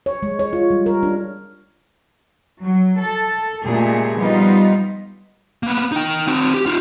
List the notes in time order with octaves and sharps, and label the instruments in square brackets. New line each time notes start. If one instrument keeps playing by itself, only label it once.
[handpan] C#5
G#3
C#5
F4
G3
A#4
D4
[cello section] F#3
A4
A#2 C#3 G#3 A3 G4 G#4
F3 G3 B3 D#4 F4
[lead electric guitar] A#3 B3
D#4 G5
C4 F#4
G4
D#4 F4